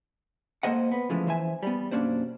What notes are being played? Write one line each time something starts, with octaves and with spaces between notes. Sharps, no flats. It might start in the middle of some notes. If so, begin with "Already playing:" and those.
G#3 A#3 A4 C5 D#5 F#5
B3
C#3 E3 F3 G#3 A3 C#4
E3 C5 E5 G#5
G3 B3
B1 F#2 A#3 C#4 D4 C5